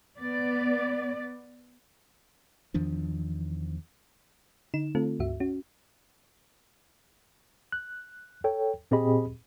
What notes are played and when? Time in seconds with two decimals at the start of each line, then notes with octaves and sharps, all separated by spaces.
0.19 B3 D5
2.74 E2 D#3 F3 D4
4.74 D3 D#4 E7
4.95 D3 A3 C4 F4 A4
5.19 C#2 G2 F#4 E5
5.40 C#4 F#4
7.72 F#6
8.44 A4 C#5 G5
8.91 A#2 C4 G4 G#4 D#5 B5